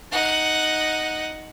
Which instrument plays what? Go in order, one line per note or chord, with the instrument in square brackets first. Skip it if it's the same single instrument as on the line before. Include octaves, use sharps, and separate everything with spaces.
[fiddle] D#4 F#5